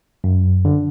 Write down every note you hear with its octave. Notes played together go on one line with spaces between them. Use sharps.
F#2
D3